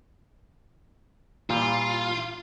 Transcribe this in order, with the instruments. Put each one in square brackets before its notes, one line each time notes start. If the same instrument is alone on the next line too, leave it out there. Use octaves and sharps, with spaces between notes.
[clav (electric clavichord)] A#2 E3 G3 [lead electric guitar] F4